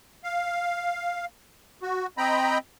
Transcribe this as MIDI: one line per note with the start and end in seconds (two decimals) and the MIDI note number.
0.24 1.25 77
1.83 2.06 66
2.18 2.58 60
2.18 2.58 75
2.18 2.58 79
2.18 2.58 82
2.18 2.58 83